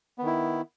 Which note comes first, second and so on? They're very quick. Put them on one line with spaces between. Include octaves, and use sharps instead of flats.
B3 D#3 E4